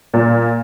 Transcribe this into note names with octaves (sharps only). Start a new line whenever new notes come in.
A#2